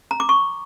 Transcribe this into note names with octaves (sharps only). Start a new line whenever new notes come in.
A#5
D6
C#6